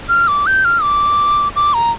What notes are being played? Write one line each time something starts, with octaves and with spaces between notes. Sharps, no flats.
F6
D6
G6
F6
D6
D6
A#5